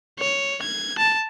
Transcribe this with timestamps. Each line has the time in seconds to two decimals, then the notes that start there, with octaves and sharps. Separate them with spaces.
0.19 C#5
0.63 G#6
0.98 A5